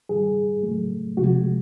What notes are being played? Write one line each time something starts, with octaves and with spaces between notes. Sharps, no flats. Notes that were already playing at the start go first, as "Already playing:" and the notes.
G#2 D#3 G3 G#4
A2 F#3 A3
C3 F3 G#3 F#4